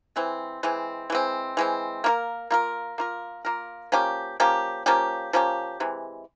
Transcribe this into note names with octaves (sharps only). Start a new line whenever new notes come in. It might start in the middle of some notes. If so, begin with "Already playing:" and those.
E3 G#3 C4
E3 G#3 C4
E3 G#3 C4
E3 G#3 C4
A#3 F4 A#4
A#3 F4 A#4
A#3 F4 A#4
A#3 F4 A#4
F3 A#3 C#4 G4
F3 A#3 C#4 G4
F3 A#3 C#4 G4
F3 A#3 C#4 G4
C3 E3 G#3